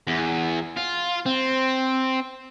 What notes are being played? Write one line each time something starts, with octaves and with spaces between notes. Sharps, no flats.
E2
F4
C4